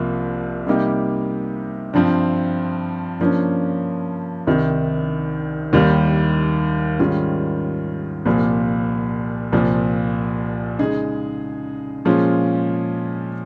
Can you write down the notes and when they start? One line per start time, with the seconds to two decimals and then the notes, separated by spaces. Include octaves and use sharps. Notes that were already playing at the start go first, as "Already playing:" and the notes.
Already playing: C2 C3 F3 A#3 F4
0.67 C3 G3 A#3 D#4 G4
1.93 G2 F3 C4
3.19 G2 F3 A#3 C#4
4.47 C2 C3 D#3
5.73 D#2 D#3 G3
6.99 G#2 D#3 G3 C#4 F4
8.25 C2 A#2 F3 A#3
9.52 C2 A#2 F3
10.79 C#3 G#3 D#4 G#4
12.05 A#2 F3 G#3 C#4 F4